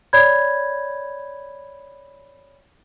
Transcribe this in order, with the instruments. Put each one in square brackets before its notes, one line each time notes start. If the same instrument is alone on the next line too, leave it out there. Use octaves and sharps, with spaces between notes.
[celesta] C#5 D5 B5 G6 G#6